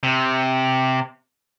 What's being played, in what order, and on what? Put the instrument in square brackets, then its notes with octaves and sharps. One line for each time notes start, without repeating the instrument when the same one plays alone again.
[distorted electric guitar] C3